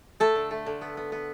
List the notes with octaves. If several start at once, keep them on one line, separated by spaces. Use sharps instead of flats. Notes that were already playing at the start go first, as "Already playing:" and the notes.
A3 A4
D3
A3
D3
B3
B3
B3